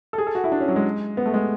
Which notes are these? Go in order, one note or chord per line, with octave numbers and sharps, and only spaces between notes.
A4
G#4
A4
F#4
E4
D4
C#4
F#3
G#3
B3
A3
G#3